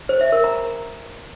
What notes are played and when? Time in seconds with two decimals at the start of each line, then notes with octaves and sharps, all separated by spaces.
0.09 C5
0.21 E5
0.32 A#4
0.44 A#5
0.56 A#5